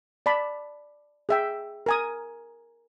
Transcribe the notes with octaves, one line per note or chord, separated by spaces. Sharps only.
D5 A5 B5
G#4 E5 G5
A#4 G#5 D#6